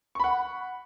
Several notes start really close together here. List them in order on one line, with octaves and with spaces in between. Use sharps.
C#6 B5 F#5